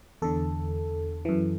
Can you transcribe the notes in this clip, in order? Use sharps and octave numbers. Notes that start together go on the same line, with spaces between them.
E2 D3 A4
F#2 E3